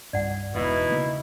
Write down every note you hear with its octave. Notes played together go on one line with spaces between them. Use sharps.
C2 G2 D5 F#5
E1 B2 D#4 E4
C#3 A#3